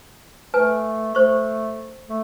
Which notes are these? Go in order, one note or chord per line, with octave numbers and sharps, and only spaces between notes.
A3 B4 G#5
A3 C5 C#6
A3